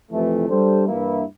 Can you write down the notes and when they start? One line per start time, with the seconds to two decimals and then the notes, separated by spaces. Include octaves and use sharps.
0.11 F2 C3 E3 A3
0.48 G3 D4 A4 C5
0.85 G2 E3 A#3 E4